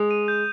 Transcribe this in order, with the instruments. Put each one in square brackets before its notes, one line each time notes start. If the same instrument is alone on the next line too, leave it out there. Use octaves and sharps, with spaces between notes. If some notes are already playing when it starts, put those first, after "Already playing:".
Already playing: [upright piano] G#3 [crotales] D#6
[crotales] D#7
G6